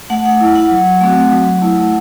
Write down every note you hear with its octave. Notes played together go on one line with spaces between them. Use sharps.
A3 F#5
F#5
E4
F#5
F#3
A3 C4 F#4
F#3
A3 E4